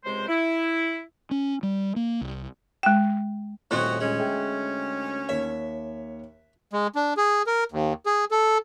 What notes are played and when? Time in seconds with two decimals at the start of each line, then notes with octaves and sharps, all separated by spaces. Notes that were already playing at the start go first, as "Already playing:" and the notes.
0.04 C#2 C3 G#3 C5
0.28 E4
1.31 C#4
1.63 G3
1.96 A#3
2.21 C2
2.83 G#3 G5
3.71 D#1 A2 C4 C#4 F#4 C#5 D#5 F#6
4.00 D2 G#3 C#4
4.19 G#4 E5 G5
5.29 D#2 C#5 E5
6.73 G#3
6.95 D4
7.17 G#4
7.47 A#4
7.72 D#2
8.06 G#4
8.31 A4